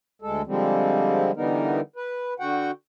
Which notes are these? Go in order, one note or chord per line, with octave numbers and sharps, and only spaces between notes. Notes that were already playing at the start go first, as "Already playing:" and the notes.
D2 G#3 A4
D3 F3 G3 G#3 C4
D3 E3 G3 B3 D#4 A#4
B4
D3 F#4 F#5 G5